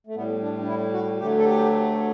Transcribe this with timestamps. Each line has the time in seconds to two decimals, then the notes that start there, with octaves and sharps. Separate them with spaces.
0.07 A3
0.15 A2 G3 B3
0.41 D4
0.62 D4
0.67 E4
0.93 F#4
1.18 D2 D3 F#3 A3 G4
1.38 A4
1.44 G4